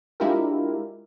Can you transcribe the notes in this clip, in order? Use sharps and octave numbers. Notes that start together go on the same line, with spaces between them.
G#3 D4 E4 F4 G4 A#4